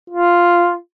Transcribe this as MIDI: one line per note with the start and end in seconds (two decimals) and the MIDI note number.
0.10 0.73 65